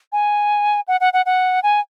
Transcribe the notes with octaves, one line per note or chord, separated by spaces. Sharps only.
G#5
F#5
F#5
F#5
F#5
G#5